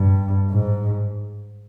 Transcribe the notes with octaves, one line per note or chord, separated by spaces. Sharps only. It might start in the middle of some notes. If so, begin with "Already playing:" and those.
Already playing: G2
G#2